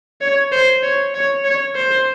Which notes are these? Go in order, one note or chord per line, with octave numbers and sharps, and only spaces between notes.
C#5
C5
C#5
C#5
C#5
C5